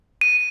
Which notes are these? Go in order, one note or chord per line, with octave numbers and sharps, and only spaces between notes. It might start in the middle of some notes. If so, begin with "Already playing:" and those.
D#7